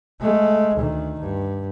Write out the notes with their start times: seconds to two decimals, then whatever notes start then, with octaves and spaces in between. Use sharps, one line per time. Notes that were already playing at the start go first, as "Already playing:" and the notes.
0.21 G#3 A3
0.77 D2 D#3
1.21 G2